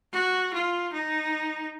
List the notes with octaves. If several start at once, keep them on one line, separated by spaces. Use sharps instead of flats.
F#4
F4
D#4